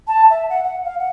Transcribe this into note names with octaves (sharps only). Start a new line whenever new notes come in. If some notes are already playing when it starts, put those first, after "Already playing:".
A5
E5
F#5
F#5
F5
F#5